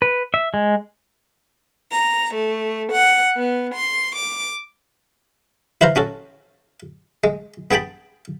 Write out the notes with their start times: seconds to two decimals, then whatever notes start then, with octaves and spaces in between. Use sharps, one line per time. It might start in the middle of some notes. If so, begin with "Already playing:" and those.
0.02 B4
0.34 E5
0.54 G#3
1.91 A#5
2.34 A3
2.92 F#5
3.36 B3
3.74 C6
4.15 D6
5.81 E4 B4 C5 F5 A#5
5.96 C#4 F#4 A4
7.24 G#3
7.71 B3 G#4 G5 A5 B5